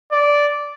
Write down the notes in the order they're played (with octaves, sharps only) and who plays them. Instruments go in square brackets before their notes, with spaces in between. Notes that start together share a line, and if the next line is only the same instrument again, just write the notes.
[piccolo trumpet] D5